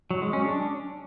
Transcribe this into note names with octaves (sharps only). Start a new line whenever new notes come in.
F#3
G#3
C#4
D4